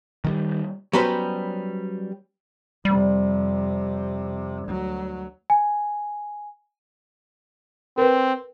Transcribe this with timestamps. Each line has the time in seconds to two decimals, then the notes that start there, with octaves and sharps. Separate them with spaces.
0.24 D#3 E3 G3
0.93 F#3 G3 B3 C#4 B4 C5
2.85 F2 C3 G3
4.65 D2 F#3
5.50 G#5
7.98 C4 A#4 B4